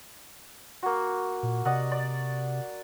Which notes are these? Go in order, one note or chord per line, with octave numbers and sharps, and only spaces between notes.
A#3 F#4
A#2
C3 D5 D#5 F#5
D5